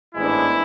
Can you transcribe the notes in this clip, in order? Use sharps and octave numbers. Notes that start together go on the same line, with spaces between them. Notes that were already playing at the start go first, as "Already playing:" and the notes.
A1 G#2 G#3 B3 D4 E4